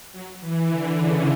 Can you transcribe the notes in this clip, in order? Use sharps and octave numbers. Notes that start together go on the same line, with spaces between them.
F#3
E3
D3
C#3